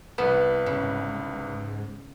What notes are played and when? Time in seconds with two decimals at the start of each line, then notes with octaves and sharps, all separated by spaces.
0.18 C2 B3 B4 E7
0.66 G#2 C#3